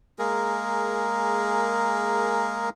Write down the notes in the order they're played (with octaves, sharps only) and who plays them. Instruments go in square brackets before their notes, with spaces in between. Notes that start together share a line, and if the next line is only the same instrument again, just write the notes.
[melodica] G#3 A#3 G#4 A#4